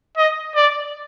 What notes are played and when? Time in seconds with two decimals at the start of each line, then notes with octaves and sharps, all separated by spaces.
0.17 D#5
0.55 D5